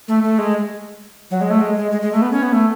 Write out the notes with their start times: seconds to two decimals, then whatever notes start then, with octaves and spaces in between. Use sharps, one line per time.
0.08 A3
0.23 A3
0.39 G#3
1.31 F#3
1.41 G#3
1.50 A3
1.61 G#3
1.77 G#3
1.91 G#3
2.02 G#3
2.13 A3
2.22 B3
2.32 C#4
2.42 B3
2.53 A3